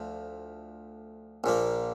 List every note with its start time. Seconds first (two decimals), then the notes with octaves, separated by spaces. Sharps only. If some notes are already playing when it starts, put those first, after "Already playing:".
Already playing: D2 F3
1.44 A#1 A#2 F3 A#3